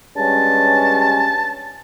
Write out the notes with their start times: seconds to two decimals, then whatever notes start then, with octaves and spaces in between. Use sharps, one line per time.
0.17 G2 G#3 C#4 A5